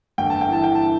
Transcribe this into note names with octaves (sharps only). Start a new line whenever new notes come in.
G1 G5
A5
G5
E3 A5
G5
A5